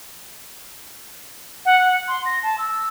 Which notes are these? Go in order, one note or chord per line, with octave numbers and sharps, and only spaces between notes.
F#5
C6
A#6
A5
E6